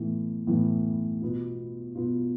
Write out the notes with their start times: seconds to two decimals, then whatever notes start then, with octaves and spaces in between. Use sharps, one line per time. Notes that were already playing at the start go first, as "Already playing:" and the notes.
Already playing: A2 E3 B3
0.47 A2 E3 B3
1.21 B2 B3 F4
1.95 B2 B3 F4